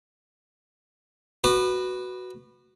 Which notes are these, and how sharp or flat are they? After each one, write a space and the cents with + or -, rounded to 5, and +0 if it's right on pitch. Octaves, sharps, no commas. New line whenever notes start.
F#4 +0 B4 +0 D#6 -45